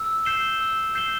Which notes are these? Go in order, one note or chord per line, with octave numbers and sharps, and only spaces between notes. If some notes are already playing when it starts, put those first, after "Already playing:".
Already playing: E6
G6 C7 E7 G7
E6
G6 C7 E7 G7